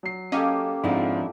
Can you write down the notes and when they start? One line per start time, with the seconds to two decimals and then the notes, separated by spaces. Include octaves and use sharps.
0.03 F#3 C7
0.32 A#3 C#4 G4 A4 D#5 F5
0.84 F2 G#2 C4 D4 E4 F4